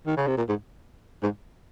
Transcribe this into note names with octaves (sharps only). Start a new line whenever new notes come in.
D#3
C#3
C3
A#2
G#2
G#2